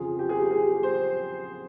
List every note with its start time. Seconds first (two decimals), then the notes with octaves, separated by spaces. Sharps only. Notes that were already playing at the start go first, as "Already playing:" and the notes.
Already playing: F2 C#3 F3 G#4
0.19 G4
0.29 G#4
0.40 G4
0.51 G#4
0.83 C5